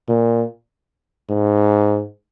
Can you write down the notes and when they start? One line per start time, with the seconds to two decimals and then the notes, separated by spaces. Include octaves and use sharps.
0.08 A#2
1.29 G#2